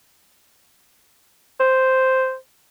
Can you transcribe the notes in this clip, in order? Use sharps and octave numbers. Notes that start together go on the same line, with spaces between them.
C5